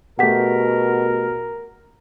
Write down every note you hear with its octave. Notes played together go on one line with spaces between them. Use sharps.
B2 A3 G4 G#4 A#4 F#5 B6